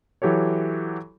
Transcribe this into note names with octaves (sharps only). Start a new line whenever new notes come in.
E3 F#3 G4 A4 C#5